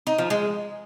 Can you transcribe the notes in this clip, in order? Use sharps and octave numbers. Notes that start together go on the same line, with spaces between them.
D#4
F3
G#3